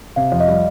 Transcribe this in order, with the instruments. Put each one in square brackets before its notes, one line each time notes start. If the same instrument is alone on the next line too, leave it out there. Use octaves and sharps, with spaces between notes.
[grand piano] C3 [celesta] F5
[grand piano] F2
[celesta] D#5
[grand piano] G3